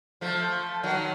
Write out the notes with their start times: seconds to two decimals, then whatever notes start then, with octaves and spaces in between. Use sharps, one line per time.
0.21 F3 A3
0.83 D#3 F#3